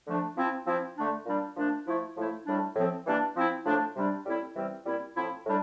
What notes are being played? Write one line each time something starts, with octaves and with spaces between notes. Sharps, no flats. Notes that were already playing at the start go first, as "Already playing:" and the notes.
D3 F3 A3 D4
F3 C4 E4
F3 C4 E4
D3 A3 D4
A#2 G3 D4
A#2 F3 A3 D4
F3 A3 E4
A2 F3 A3 E4
A2 G3 D4
A2 F3 C4
E3 G3 A#3 D4
F3 C4 E4
A2 F3 A3 D4
C3 G3 D4
A2 G3 C4 E4
C3 E3 G3 C4
A#2 G3 C4 E4
A2 F3 C4 E4
A2 G3 D4